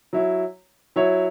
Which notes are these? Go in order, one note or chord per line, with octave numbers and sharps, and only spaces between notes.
F#3 E4 C#5
F#3 E4 C#5